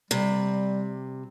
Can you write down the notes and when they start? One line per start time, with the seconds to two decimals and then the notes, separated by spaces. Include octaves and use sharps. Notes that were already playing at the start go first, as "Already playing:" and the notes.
0.11 C3 G3